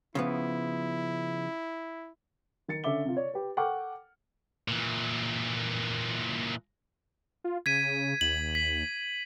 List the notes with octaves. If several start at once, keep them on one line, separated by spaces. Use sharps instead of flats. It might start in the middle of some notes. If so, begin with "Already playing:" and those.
C#3 F3 B3 E4
D#3 A6 C#7
D3 C#4 E5 D6 G7
C3 F4
C#5 D5
G4 B4
A4 F#5 G5 C#6 D6 F6
A#2 E3
F4
C#3 G#6 B6 D#7
D#2 F#7
B6